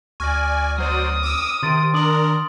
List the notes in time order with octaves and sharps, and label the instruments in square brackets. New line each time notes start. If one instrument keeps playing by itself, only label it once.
[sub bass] D2 [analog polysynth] D5 G#5 [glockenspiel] C#6 F6 A#6
[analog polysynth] F#3 C5 D5 [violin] D#6
[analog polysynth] D6 E6
[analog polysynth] C3 [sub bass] D#3 [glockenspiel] C6 A6 D7
[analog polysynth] D4 A#4 [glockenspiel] D6 D#6 F#7